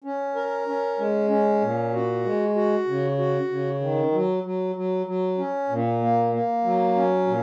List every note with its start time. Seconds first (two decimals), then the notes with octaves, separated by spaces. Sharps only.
0.04 C#4
0.35 A#4
0.68 C#4
0.99 G#3
1.30 C#4
1.61 A#2
1.93 F#4
2.25 G#3
2.55 F#4
2.87 C#3
3.18 F#4
3.50 C#3
3.81 D#3
4.12 F#3
4.43 F#3
4.75 F#3
5.06 F#3
5.38 C#4
5.69 A#2
6.00 A#3
6.32 A#3
6.64 F#3
6.96 C#4
7.27 A#2